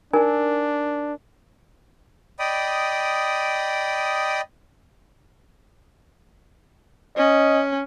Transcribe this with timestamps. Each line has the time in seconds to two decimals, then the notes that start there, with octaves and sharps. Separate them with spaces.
0.13 D4 D#4 A#4 G#5
2.39 D5 D#5 G5 B5 D#6
7.18 C#4 D#5